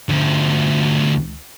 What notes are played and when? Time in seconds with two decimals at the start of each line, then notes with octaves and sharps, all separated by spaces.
0.09 D2 F3